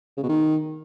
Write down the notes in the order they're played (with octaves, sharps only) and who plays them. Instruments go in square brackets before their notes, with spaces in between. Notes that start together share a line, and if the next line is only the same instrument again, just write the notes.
[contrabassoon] C#3
B2
D#3